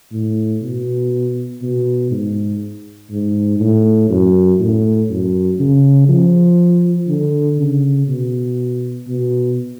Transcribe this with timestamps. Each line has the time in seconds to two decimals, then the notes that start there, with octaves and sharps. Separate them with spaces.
0.12 A2
0.62 B2
1.62 B2
2.11 G#2
3.11 G#2
3.60 A2
4.10 F#2
4.60 A2
5.10 F#2
5.59 C#3
6.09 F3
7.08 D3
7.59 C#3
8.08 B2
9.07 B2